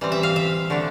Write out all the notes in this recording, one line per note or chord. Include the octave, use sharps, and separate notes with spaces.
E3 G3 C4
E5
F5
E5
D3 A3 D4